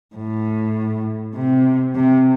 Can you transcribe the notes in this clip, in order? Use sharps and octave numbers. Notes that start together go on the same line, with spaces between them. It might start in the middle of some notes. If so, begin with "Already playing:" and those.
A2
C3
C3